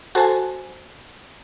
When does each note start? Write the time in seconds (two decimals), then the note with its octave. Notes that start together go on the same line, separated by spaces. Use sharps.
0.15 F#4 A4 C5 G#5 A5